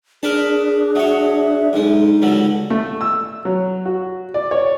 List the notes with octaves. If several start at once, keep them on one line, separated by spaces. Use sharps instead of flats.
D4 G#4 A#4 B4 A5
F#3 C#5 E5
B1 G#3 D#4
C#2 D3 F#3
A3
E6
F#3
F#4
D5
C#5